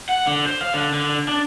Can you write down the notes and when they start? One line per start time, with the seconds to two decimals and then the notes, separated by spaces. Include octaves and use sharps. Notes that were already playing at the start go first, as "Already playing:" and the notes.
0.09 F#5
0.27 D3
0.46 C5
0.61 F5
0.74 D3
0.93 D3
1.28 D4